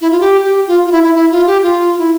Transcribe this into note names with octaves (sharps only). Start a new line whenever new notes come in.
E4
F4
G4
G4
F4
F4
E4
E4
E4
F4
G4
F4
E4